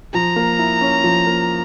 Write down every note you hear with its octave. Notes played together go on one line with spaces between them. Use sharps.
F3 A#5
A#3
E4
C#4
F3
A#3